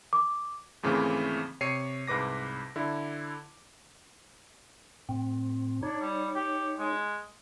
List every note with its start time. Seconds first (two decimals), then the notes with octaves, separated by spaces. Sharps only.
0.13 D6
0.83 D#2 G#2 C#3 E3 A3 C4
1.61 C3 C#5 C7 C#7 D#7
2.07 C2 G#2 B4 D6 A#6
2.76 D3 E4
5.09 A2 C4
5.83 D4 D#4 C#5
6.01 G3
6.35 G4
6.79 G#3